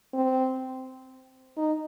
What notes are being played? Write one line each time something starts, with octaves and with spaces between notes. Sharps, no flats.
C4
D#4